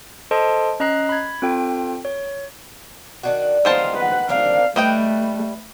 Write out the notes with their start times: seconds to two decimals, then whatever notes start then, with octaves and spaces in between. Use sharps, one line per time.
0.31 A4 C5 D#5 A5 C6 D7
0.80 C#4 D#5 A#5 F#6 C7
1.09 B5 G#6
1.42 C4 F4 A4 G5
2.05 C#5
3.23 D#3 D4 F#4
3.65 D#3 G#3 B3 F4 C5 F5 A5
3.97 B4 F#5
4.29 C4 D4 A#4 F5
4.76 G3 A3 B4 D#5 G5